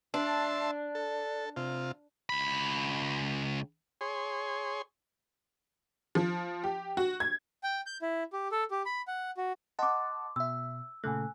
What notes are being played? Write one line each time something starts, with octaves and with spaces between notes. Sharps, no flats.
D4 E5 A5 C6
A4
C3 F4
C#2 B5
G#4 C#5 C6
F3
G4
F#4
G#6
G5
G6
E4
G4
A4
G4
B5
F#5
F#4
D#5 F#5 A5 C6 D6
B2 E5 E6
A#2 C#3 A3 G#5 E6 F#6